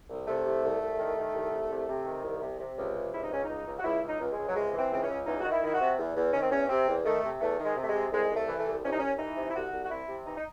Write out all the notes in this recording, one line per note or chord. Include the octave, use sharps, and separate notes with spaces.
C2
C3 A3
C2
C2
C2
D#3
D#3
C2
C2
C3
C3
D#3
C2
C3
C3
C#2
C3
C#2 E4
D#4
C#2 C#4
C#2 D#4
C#2
F#4
C#2 E4
C#2
D#4
C#2
G#3
C#2
F#3
C3 G#3
E3
C4
C#2 C4
C#4
C#2
E2 D#4
D#3 F#4
E4
D#3 E4
F#4
C3
E2
E2
D#3 C#4
C4
E2 C#4
C3 C4
E2
D#3 A3
C3
E2 A3
D#3
G#3
C3
A3
G#3
C3
C2 G#3
C2
A3
E3
A3
C2
C2 C#4
D#4
C2 C#4
E3 D#4
C3
E4
C2 F#4
C2
F#4
C3 E4
C3
E3 D#4
D#4